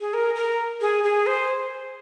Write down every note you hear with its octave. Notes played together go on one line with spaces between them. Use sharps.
G#4
A#4
A#4
G#4
G#4
C5